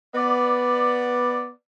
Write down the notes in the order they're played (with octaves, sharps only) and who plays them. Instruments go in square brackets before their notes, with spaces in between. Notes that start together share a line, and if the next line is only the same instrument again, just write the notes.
[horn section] B3 D5